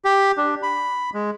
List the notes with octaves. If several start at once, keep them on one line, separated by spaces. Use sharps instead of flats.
G4
D4
B5
G#3